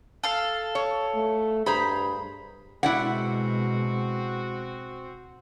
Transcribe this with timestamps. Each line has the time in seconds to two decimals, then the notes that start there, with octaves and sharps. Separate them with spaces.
0.24 A4 F5
0.75 C#5
1.16 A3
1.66 G2 G#4 C5 A#5 B5
2.83 B2 G#3 C4 E4 F#4 D5 F#5